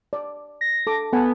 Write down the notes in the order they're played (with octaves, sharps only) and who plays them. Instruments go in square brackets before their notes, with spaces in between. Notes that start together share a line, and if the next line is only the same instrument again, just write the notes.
[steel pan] D5
[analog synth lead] A#6
[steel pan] A4 D6
[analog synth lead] B3 [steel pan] A4 F#5 G#5